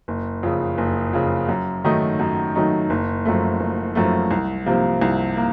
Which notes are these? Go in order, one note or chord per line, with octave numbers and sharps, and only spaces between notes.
F#1
F2 C#3
F#1
F2 C#3
F#2
D#3 F#3 A3 D#4
F#2
D#3 F#3 A3 D#4
F#1
F#2 F3 A3
F#1
F#2 F3 A3
C2
C3 F3 A#3
C2
A#3